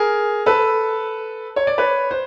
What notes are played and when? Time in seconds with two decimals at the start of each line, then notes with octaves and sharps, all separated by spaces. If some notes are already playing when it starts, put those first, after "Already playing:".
Already playing: G#4 A#4
0.46 A4 B4
1.56 C#5
1.67 D5
1.78 B4 C#5
2.11 C5